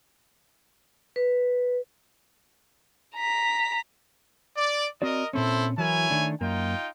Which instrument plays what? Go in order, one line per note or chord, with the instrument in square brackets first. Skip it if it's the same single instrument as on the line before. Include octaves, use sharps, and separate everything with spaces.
[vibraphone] B4
[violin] A#5 B6
[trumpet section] D5
[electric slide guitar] C4 F#4 D5 [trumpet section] A#4 D#5
[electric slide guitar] A#2 C4 C#4 [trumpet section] E4 A4 C5
[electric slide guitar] E3 F#3 A#4 [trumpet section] E4 C#5 G#5
[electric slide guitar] D#3 A3 D4
[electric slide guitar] F#2 A#3 [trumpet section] D#4 F4 G5